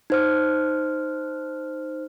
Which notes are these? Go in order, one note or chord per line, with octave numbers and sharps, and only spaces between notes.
D#4 C5 F6